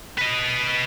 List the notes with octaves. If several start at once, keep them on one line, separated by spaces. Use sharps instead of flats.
B4 D#5